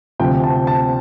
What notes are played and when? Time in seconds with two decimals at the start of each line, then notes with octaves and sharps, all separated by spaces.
0.19 D2 C3 F3 G5
0.43 A5
0.67 A5